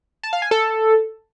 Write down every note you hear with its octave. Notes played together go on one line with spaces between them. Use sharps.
A5
F5
G#5
A4